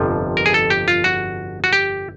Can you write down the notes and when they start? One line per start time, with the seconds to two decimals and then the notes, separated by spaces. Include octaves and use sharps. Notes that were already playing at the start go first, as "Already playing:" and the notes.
Already playing: G1 F2 C3 F3
0.37 A#4
0.46 G#4
0.54 A4
0.70 G4
0.88 F4
1.04 F#4
1.64 F#4
1.73 G4